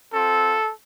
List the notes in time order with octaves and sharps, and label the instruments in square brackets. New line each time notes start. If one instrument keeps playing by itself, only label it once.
[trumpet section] C4 F4 A4